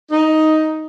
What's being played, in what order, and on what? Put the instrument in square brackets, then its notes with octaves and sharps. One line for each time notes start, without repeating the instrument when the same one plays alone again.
[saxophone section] D#4